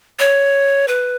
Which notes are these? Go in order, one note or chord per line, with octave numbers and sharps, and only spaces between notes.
C#5
B4